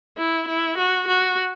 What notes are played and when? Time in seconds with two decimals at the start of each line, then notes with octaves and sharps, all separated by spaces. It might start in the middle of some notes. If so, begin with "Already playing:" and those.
0.18 E4
0.48 E4
0.78 F#4
1.07 F#4